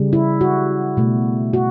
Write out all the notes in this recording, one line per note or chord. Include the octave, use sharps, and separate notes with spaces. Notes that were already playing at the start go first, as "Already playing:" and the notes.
Already playing: C#3 G3
E4
F#4
B2 A3
F#4